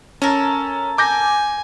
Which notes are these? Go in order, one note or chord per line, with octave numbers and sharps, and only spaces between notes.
C#4 A4 A#4
G#5 D6 G6 A#6